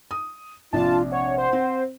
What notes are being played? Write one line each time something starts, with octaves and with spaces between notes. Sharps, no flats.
D#6
A#1 C3 D4 F4 A5
C#5 F#5
C5
C4